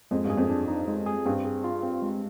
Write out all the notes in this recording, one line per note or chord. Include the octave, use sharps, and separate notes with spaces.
F2 G#3
G2
G#4
F2
D4
D#4
G#3
G#4
G2 C4
G#4
F4
C4
G#3